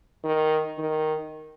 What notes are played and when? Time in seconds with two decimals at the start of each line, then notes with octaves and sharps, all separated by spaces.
0.24 D#3
0.78 D#3